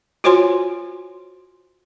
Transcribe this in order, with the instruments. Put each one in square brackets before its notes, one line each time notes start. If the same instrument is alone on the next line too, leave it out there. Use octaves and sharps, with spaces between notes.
[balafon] F4 F#4 C5 C#5 G#5 C6